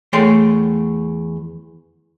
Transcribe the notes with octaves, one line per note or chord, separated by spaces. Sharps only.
E2 A3 C#5 G5 C6